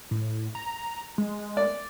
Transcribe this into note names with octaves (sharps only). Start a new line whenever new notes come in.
A2
A#5
G#3
D5